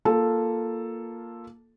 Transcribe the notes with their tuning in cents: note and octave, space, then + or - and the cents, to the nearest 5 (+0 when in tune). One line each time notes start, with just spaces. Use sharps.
A#3 +0 F4 +0 A4 +0